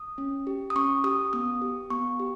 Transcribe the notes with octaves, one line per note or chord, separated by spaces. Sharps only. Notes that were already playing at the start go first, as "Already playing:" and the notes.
Already playing: D#6
C#4
G4
D#6
C#4 C#6
G4 D#6
B3 D#6
G4
B3 C#6
G4